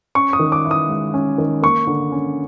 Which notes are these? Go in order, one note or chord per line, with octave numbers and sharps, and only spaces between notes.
C#4 C#6
D#6
D#3
D6
E4
D#6
G#3
C#4
D#3
A#3 C#6
D3
C#4